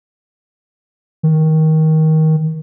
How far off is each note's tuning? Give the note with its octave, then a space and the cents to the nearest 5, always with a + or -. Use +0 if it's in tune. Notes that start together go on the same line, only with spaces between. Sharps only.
D#3 +20